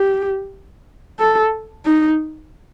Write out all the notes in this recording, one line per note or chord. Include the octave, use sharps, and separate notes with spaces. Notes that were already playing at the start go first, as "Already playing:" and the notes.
Already playing: G4
A4
D#4